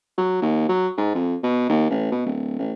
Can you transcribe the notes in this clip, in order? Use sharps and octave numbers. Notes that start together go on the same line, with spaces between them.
F#3
D#2
F#3
G#2
F2
B2
D#2
A1
B2
D1
A1